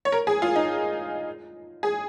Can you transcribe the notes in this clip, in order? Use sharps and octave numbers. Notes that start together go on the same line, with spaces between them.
C#5
A#4
G#4
F4
D#4
G#4